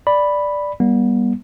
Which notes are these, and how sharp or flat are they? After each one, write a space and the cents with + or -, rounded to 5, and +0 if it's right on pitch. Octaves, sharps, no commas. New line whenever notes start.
D5 +0 B5 +0
G3 +0 B3 -35